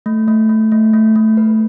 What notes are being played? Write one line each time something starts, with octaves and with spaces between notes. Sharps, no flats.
A3
A3
A3
A3
A3
A3
B4